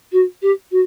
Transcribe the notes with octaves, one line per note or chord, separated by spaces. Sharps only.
F#4
G4
F#4